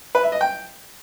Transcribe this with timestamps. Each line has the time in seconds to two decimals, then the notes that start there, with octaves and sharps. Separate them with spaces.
0.15 B4
0.23 E5
0.32 D#5
0.41 G5